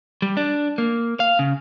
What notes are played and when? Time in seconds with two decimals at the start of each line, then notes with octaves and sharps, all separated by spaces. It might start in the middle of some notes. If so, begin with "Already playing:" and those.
0.22 G3
0.37 D4
0.78 A#3
1.20 F5
1.39 C#3